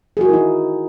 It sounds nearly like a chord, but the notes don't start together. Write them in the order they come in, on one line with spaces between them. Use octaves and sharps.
G#4 F#4 A#4 E4 D#4